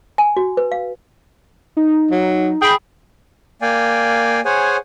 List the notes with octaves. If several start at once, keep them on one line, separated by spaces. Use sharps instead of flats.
G#5
F#4
B4
F5
D#4
F#3
G#4 G5 B5
A#3 D5 F5 G5 G#5
G#4 C5 C#5 F#5 G#5